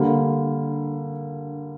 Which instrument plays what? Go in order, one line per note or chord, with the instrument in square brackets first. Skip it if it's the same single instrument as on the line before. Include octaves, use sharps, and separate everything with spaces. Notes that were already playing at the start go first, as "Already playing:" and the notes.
Already playing: [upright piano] D3 G3 A#3